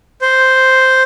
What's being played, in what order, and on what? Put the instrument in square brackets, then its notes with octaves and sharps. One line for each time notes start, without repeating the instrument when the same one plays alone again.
[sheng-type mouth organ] C5